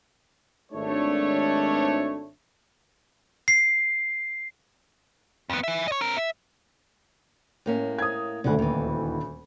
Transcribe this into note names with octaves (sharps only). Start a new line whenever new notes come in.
G#1 A3 D4 C#5
C7
F2 B3
E3 E5
C#5 D#5
C4 A#4
E5
A2 A#3 C#4
D#6 G#6
D#1 D2 D3 A3 F#5
D#2 E3